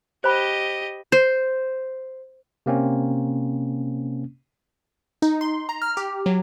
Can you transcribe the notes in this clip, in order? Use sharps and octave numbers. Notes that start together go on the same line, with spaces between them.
G4 C5 D#5 B5
C5
C3 A#3 C4 C#4
D#4
C6
A#5
F6
G4
F#3